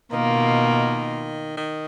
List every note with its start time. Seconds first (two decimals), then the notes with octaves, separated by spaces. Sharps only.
0.12 B2 D#3 A#3 F4
1.57 D#3